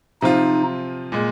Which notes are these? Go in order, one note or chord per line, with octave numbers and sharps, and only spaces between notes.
C3 F3 C4 D#4 F4
A#2 G#3